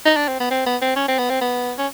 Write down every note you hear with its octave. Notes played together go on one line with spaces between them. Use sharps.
D#4
D4
C4
B3
C4
B3
C4
C#4
C4
B3
C4
B3
C#4